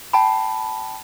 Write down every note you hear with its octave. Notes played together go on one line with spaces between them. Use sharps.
G5 A5 B5